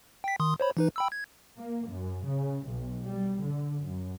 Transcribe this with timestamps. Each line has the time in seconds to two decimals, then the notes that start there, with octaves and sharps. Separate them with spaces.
0.24 G5 B6
0.40 D#3 C6 D#6
0.60 C5 C#5 B5
0.77 E3 D#4 B4
0.96 G5 B5 E6
1.12 G#6
1.57 A#3
1.89 F#2
2.27 C#3
2.67 B1
3.04 G3
3.43 D3
3.83 F#2